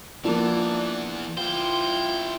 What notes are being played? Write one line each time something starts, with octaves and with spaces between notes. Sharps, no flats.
E3 F3 A#3 B3 D4
E4 F4 C5 G5